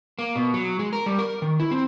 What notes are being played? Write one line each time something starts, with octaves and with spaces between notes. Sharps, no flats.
A#3
B2
F#3
G#3
A#4
G3
A#4
D#3
E4
C4